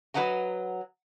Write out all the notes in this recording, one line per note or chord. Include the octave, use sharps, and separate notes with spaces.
F#3 B4 D#5 F#5 A#5